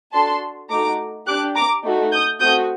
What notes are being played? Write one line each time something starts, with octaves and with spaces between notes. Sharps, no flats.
D4 F#4 A4 A5 C6
A3 D#4 F#4 A#5 D6
D4 G4 D6 F#6
A#5 D6
A3 D#4 F#4 A4
D#6 G6
A3 C4 F#4 D#6 G6